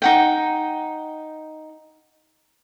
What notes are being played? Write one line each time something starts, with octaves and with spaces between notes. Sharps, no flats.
D#4 F#5 G5